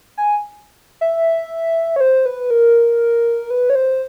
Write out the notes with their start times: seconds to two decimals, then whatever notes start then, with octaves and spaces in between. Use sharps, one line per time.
0.18 G#5
1.01 E5
1.96 C#5
2.01 C5
2.26 B4
2.50 A#4
3.50 B4
3.70 C#5
3.75 C5